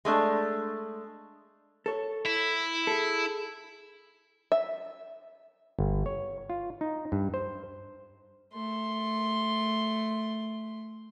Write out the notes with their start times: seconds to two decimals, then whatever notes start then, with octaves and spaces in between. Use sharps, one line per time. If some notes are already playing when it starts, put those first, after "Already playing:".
0.05 G#3 A3 D4
1.86 A4 C#5
2.26 E4
2.87 G#4 A4
4.52 E5
5.79 G1
6.06 C#5
6.50 F4
6.81 D#4
7.12 G2
7.34 C5
8.53 A3 C6